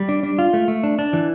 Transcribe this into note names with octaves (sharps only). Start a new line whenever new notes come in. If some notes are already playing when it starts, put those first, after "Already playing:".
Already playing: G3
D4
D4
F4
A3
A3
D4
D4
E3